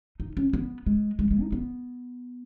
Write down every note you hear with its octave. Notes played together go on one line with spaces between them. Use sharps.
D#4
C#4
B3
G#3
G#3
G#3
D#4
B3